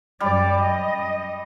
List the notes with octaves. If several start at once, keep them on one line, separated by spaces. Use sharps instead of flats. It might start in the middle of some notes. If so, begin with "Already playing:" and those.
F#2 G3 D5
D#5